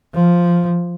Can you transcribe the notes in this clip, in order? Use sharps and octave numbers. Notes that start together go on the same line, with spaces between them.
F3